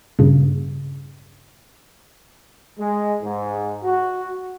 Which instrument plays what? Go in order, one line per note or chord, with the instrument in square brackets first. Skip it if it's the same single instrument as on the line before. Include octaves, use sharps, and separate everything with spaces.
[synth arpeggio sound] G2 A#2 C#3
[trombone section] G#3
G#2
F#4